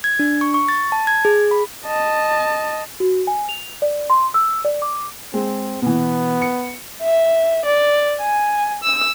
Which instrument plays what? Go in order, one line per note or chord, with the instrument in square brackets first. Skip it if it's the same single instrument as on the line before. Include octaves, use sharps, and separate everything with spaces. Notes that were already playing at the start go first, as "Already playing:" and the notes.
[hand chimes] G#6
D4
C#6
C#6
A6
A5
G#6
G#4
B5
[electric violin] D#5 A5
[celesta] F#4
G#5
F7
D5
C6
E6
D5
D6
[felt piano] G#3 [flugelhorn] C4
[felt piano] B2 E3 [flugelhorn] B3
[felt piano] C#7
[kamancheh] E5
D5
G#5
E6